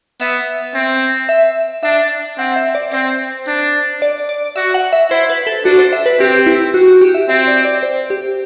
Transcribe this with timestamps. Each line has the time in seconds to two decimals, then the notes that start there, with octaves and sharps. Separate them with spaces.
0.20 B3 E5
0.75 C4
1.29 E5
1.83 D4 E5
2.38 C4 F#5
2.56 E5
2.75 D5
2.92 C4 C5
3.47 D4
4.02 D5
4.29 D5
4.56 F#4 E5
4.74 F#5
4.93 E5
5.10 E4 C5
5.30 B4
5.47 A4
5.65 D4 F#4
5.78 C5
5.93 E5
6.06 B4
6.20 C4 G4
6.46 E4
6.74 F#4
6.88 F#4
7.01 G4
7.14 E5
7.29 C4 E5
7.47 D5
7.65 D5
7.83 C5
8.10 G4